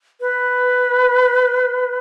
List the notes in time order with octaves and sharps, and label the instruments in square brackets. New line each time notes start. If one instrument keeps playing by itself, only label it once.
[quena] B4